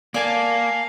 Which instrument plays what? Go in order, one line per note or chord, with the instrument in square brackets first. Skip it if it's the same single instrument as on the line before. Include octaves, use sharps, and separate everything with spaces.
[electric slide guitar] A#3 [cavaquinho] D5 G#5 A5 [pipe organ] F5